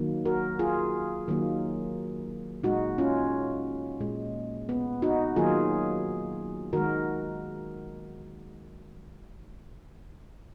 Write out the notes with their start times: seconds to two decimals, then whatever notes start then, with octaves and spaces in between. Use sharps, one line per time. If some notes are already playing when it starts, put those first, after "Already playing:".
Already playing: D#3 F#3 A#3
0.25 F#4 A#4
0.59 F4 G#4
1.28 D#3 F#3 A#3
2.63 A#2 G#3 D#4 F#4
2.98 C#4 F4
4.00 A#2 G#3
4.69 B3
5.02 D#4 F#4
5.36 D#3 F#3 A#3 F4 G#4
6.73 D#3 G#3 F#4 A#4